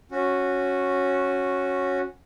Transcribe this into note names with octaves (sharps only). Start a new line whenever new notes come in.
C#4 F#4